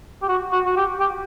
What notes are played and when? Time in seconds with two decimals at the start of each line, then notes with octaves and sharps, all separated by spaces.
0.22 G4
0.29 F#4
0.52 F#4
0.66 F#4
0.77 G4
1.00 G4